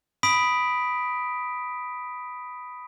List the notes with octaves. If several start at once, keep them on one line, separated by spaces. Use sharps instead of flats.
B5 D#6 B6 D7